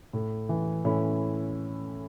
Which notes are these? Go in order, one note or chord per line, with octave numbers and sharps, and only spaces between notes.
A2
E3
A2 C#4 E4